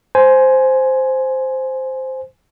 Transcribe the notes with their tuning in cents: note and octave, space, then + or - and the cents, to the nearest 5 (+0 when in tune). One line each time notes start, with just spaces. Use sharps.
C5 +0 G#5 +10